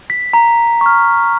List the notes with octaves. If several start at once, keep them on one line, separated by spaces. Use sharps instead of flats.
B6
A#5
C#6 F6